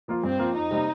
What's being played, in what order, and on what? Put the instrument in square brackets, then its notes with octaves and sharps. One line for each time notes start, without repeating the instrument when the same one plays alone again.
[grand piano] F3 A#3 F4
[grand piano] G2 [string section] C4
[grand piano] F3 A#3 F4
[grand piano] F2 [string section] D#4
[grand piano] C3 G3 A#3